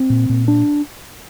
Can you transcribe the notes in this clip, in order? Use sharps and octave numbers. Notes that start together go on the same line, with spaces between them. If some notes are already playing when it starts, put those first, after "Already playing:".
Already playing: C4
A#2
A#2
D4